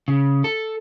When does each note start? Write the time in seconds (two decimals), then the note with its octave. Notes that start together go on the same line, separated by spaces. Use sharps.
0.08 C#3
0.44 A4